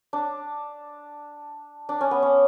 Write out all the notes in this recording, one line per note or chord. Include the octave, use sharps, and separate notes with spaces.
D4
D4
C#4
B3
C#4